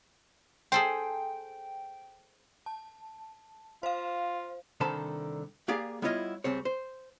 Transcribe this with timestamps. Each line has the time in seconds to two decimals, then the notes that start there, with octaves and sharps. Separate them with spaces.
0.72 G#4 A4 C5 G5
2.66 A5
3.83 F4 C5 F5
4.80 C2 D3 D#3 C5 A5 B5
5.68 A#3 G4 G#4 D5 F5
6.02 G3 B3 E4 F4 C#5 D#5
6.44 C#2 G3 C4 C#5
6.65 C5